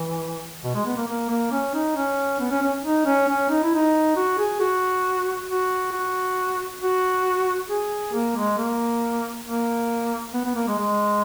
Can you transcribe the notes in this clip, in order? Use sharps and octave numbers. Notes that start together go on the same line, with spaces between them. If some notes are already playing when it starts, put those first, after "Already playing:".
Already playing: E3
B2
G#3
B3
A#3
A#3
A#3
C#4
D#4
C#4
B3
C#4
C#4
D#4
C#4
C#4
D#4
E4
D#4
F#4
G#4
F#4
F#4
F#4
F#4
G#4
A#3
G#3
A#3
A#3
B3
B3
A#3
G#3
G#3